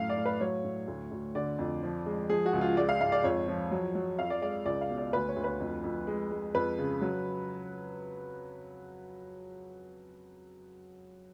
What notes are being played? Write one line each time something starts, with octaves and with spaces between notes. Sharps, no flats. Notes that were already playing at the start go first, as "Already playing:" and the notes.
Already playing: F#2 A2 F5
D5
A2
B4
F#3 C#5
A2
D2
D2
D3 D5
F2
F3
G#3
F3 G#4
F#4
C#2
F4
G#3 D5
F5
G#2 F5
D5
F2 C#5
F3
F#3
F#3
F2 F5
D5
G#3 D5
C#2 D5
F5
B2
D5
D2 B4
C#5
D2
B4
F2
F2
G#3
G#3
F2 B4
C#3
F#3